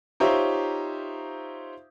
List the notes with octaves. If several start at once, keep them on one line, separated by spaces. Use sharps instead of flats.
D#4 F4 G4 C5 C#5 E5